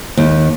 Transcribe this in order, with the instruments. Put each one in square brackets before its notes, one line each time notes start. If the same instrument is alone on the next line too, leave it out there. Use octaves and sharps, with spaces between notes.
[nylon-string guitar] D#2